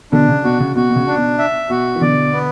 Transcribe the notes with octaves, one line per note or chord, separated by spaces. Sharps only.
B2 D3 D4
C#3
B2 F#4
C#3
B2 F#4
B2
C#3
D4
B2
E5
B2 F#4
E3
B2 D3 D5
B3